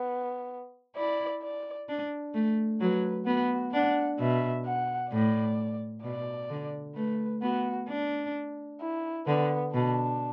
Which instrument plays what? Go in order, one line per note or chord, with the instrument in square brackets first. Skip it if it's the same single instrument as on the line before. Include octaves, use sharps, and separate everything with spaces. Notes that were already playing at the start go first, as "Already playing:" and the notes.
Already playing: [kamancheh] B3
[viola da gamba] E4 [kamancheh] D5
[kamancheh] D5
[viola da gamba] D4
A3
[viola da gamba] F#3 [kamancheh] B4
[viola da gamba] B3 [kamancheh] F#4
[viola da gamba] D4 [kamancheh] F#5
[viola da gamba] B2 [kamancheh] E5
[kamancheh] F#5
[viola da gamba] A2 [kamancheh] D5
[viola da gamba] B2 [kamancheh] D5
[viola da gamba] D3
[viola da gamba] A3 [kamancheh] B4
[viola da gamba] B3 [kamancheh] F#4
[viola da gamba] D4
[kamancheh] E4
[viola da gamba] D3 [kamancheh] B3
[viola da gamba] B2 [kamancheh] D4